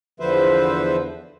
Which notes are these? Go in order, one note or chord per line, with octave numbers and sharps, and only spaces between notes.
E2 D3 F3 B4 C5 E5